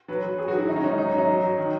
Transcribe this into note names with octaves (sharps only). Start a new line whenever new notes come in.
F#3 B4
F#3
F#3 G#4
F#4
F#3 E4
D#3 D#4
C#4
G#2 D#4
F#3 D#4
F#3 C#4
D#4
F#3
F#3
D#3